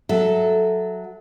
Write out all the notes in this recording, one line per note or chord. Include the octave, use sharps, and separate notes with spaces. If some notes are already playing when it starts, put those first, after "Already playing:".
F#3 A4 E5